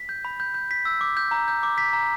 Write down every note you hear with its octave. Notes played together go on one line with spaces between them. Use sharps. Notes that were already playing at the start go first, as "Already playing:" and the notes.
Already playing: B6
G6
B5
G6
G6
B6
E6
D6
G6
A#5
G6
D6
B6
A#5